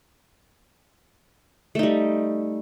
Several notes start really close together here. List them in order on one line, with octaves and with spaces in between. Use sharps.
A3 D#4 G3